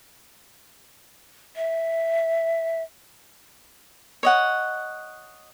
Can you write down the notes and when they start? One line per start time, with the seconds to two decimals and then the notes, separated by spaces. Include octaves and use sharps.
1.56 E5
4.23 C#5 D#5 F#5